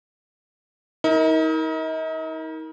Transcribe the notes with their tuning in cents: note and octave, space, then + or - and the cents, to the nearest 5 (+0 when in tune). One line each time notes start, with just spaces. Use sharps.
D#4 +40 A#4 +0